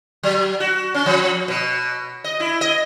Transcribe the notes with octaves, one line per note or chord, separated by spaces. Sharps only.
F#3
F#4
C#4
F3
B2
D#5
E4
D#5